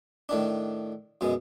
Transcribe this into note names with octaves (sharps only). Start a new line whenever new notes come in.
A2 D#3 D4
F#2 B2 G#3